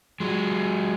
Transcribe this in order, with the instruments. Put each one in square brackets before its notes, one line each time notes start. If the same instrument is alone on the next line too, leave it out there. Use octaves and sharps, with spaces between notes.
[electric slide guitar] F#3 G#3